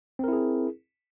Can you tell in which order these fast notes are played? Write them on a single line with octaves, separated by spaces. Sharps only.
C4 A#4 E4 G#4